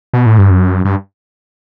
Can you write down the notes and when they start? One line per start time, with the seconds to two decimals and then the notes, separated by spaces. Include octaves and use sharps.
0.13 B2
0.26 A2
0.38 G2
0.50 F#2
0.85 G2